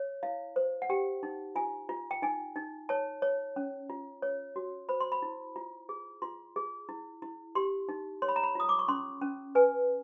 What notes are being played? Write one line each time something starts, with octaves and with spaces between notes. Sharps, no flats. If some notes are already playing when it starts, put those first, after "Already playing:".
Already playing: C#5
E4 F5
C5
F#5
G4 G5
D#4
F4 G#5
F4
G5
D#4 G#5
D#4
C#5 A5
C#5
C#4
F4
C#5
F#4
C5 B5
C6
B5
E4
F4
G#4
F4 C6
G#4
E4
E4
G4 C6
D#4
C#5 C6
B5
A#5
B5
F4 D#6
D6
C#6
C#4 C6
C#4
B4 G#5